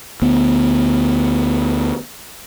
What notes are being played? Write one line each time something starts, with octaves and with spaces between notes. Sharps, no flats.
D2 B3